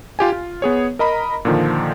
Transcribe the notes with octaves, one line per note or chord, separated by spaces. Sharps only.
F4 G4 G#5
F4
B3 G#4 C#5
A#4 D#5 A#5 B5
A#2 D3 D#3 F3